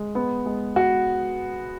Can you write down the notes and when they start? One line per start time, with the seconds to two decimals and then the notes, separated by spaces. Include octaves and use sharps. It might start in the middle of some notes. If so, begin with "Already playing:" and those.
Already playing: G#3
0.15 B3
0.46 G#3
0.76 F#4